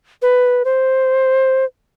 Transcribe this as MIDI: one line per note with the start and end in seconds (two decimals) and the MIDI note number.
0.22 0.63 71
0.65 1.65 72